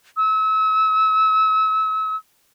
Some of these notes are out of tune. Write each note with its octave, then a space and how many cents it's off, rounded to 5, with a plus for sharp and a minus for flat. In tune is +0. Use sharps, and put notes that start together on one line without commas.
E6 -35